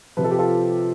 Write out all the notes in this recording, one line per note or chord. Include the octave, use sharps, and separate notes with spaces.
C3 F3 B4
A4
G4
F4 A4